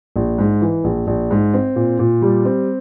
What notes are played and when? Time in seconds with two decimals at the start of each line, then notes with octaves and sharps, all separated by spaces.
0.16 A#1
0.38 G#2
0.61 E3
0.84 A#1
1.07 A#1
1.31 G#2
1.54 C4
1.76 A#2
1.99 A#2
2.22 G3
2.45 C4